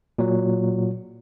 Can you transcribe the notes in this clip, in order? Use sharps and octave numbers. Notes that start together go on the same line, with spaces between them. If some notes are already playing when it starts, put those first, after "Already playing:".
A#2 F#3